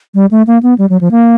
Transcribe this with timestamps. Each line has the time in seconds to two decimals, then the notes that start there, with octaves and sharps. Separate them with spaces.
0.15 G3
0.31 A3
0.47 A#3
0.63 B3
0.78 G3
0.90 F#3
1.01 F3
1.11 A#3